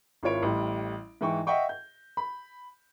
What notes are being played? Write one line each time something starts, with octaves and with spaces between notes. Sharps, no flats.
G#1 E4 F4 C#5 D7
A1 A2 G3
G#2 E3 G5 C#6
D#5 E5 F#5 G5 C#6
G6
B5